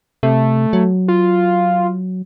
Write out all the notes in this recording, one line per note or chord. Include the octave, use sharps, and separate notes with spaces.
C3 A3
F#3
F4